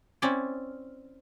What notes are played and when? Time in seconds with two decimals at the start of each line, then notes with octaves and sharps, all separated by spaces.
0.22 C4 C#4 E4 D5